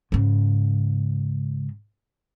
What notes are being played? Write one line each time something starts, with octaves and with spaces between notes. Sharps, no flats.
G#2 C#3